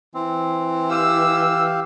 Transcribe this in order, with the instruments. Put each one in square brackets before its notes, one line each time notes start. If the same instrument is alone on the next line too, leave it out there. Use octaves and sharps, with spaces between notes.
[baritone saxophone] E3 [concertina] C4
[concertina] G4 F5 [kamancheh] E6